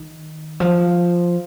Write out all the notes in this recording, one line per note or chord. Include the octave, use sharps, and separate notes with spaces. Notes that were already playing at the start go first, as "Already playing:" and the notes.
Already playing: D#3
F3